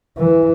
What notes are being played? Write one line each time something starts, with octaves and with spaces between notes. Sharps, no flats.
E3